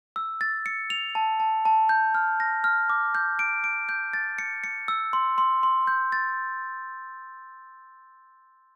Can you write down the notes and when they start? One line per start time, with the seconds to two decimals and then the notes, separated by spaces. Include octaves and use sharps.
0.16 E6
0.41 A6
0.66 C#7
0.90 F7
1.15 A5
1.40 A5
1.65 A5
1.89 G6
2.14 F6
2.40 A#6
2.64 F6
2.90 D6
3.15 G6
3.39 D7
3.64 D7
3.89 G6
4.13 A6
4.39 C#7
4.64 C#7
4.88 E6
5.13 C6
5.38 C6
5.63 C6
5.87 G6
6.12 A6